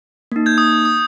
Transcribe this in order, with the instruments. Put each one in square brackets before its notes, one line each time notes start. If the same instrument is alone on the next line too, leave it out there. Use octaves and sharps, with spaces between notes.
[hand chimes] A#3 D#4
[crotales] G6 G#6
D#6
D#6